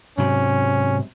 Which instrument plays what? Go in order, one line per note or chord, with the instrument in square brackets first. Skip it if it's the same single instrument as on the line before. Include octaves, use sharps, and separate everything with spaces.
[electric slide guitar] G#2 C3 F#3 [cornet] C#4